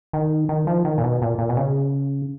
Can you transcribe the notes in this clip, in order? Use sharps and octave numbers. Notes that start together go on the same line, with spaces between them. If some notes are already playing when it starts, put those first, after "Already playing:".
D#3
D#3
F3
D#3
A#2
B2
A#2
A#2
B2
C#3